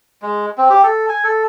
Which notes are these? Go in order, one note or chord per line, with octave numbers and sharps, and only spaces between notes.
G#3
C4
G4
A4
G#5
A4